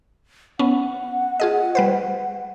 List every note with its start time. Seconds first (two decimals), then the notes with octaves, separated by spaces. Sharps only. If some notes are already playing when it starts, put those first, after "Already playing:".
0.59 B3 C#4 F#5
1.40 F4 G#4 D#5
1.75 G3 B4 C5